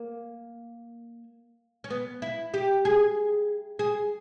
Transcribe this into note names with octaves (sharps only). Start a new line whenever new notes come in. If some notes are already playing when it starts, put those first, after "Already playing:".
Already playing: A#3
C#4
B3
E4
G4
G#4
G#4